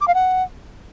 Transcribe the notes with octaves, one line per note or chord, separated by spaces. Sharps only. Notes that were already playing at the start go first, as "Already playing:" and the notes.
D6
F5
F#5